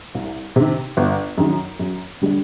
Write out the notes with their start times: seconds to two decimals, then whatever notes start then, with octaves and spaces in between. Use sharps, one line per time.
0.15 C2
0.56 C3 D#3
0.97 G1
1.38 F#2 D#3 F#3
1.79 F#2
2.22 D3 G3 D4